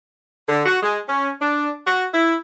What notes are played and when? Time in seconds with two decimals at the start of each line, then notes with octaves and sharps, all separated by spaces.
0.48 D3
0.66 F#4
0.83 G#3
1.08 C#4
1.41 D4
1.86 F#4
2.13 E4